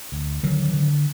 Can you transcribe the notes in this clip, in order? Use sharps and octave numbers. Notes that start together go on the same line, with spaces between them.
D2
D3 D#3 F#3
D3